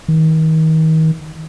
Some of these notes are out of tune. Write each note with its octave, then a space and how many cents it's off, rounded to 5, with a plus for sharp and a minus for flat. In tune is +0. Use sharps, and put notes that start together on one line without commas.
D#3 +35